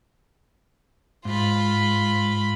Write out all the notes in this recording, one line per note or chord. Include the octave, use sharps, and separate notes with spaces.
G#2 F4 B5